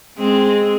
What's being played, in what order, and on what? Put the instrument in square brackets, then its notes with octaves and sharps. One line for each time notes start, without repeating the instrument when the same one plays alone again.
[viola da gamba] G#3 C4